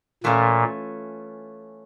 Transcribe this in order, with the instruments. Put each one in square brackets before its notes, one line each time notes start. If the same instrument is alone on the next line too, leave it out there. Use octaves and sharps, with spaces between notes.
[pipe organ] A#2 [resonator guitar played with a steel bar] E3 A3 C#4 F4